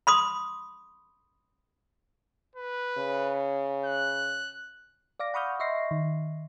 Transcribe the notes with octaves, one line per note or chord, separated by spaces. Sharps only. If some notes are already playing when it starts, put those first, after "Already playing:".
B5 C6 D#6
B4
C#3
F#6
D5 F5 D6 A#6
F#5 B5 C#6 D#6 F6 G6
D#5 E5 C6 C#6 A#6 C7
D#3